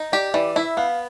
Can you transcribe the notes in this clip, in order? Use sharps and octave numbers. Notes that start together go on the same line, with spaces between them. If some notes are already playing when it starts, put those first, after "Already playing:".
Already playing: D#4
G4 D5
E3 D5
E4 E5
B3 F5